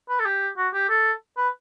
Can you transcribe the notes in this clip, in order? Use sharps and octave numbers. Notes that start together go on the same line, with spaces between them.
B4
A4
G4
F#4
G4
A4
B4